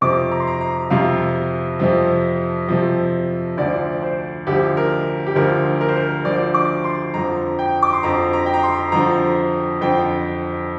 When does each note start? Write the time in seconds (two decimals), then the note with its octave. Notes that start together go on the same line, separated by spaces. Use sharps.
0.01 F2 C3 F3 D6
0.32 A#5
0.40 C6
0.47 A#5
0.61 A#5
0.90 F2 C3 F3 F5
1.79 F2 C3 F3
2.68 F2 C3 F3
3.57 D2 D3 F3 D5
4.03 C5
4.47 D2 D3 F3 G4
4.77 A#4
5.26 G4
5.36 D2 D3 F3 A#4
5.81 A#4
5.88 C5
5.96 A#4
6.25 D2 D3 F3 D5
6.54 D6
6.84 C6
7.14 F2 D3 F3 A#5
7.59 G5
7.83 D6
7.93 C6
8.03 F2 D3 F3 A#5
8.33 A#5
8.46 G5
8.54 A#5
8.63 C6
8.92 F2 D3 F3 A#5
9.81 F2 D3 F3 G5